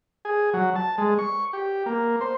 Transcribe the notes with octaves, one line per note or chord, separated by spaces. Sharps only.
G#4
F#3
A5
G#3
C#6
G4
A#3
C5